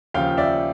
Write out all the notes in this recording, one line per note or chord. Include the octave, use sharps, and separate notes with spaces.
D#2 C#3 F3 F5 G5
D5 E5